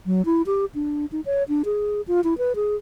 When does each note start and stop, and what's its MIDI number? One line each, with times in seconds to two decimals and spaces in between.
0.06 0.25 54
0.25 0.42 64
0.46 0.65 67
0.75 1.06 62
1.12 1.21 63
1.26 1.43 73
1.48 1.62 62
1.65 2.01 68
2.08 2.21 65
2.24 2.37 64
2.38 2.55 71
2.55 2.76 68